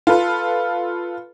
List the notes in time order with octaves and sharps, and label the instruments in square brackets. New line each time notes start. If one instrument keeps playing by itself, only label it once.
[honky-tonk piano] F4 A4 B4